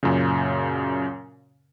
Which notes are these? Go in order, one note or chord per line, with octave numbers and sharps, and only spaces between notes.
F#2 A#2 C#3